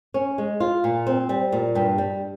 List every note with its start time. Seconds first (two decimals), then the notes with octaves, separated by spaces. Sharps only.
0.14 C#4
0.38 G#3
0.60 F4
0.84 A#2
1.07 C4
1.29 G3
1.52 A#2
1.75 G2
1.98 G3